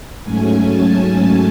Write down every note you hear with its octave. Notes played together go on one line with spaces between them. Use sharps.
G#2 F#3 A3 C#4 G#5
A5
G#5